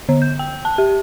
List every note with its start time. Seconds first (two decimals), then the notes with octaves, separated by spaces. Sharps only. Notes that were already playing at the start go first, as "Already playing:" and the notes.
0.09 D3
0.22 G6
0.39 G5
0.65 A5
0.78 G4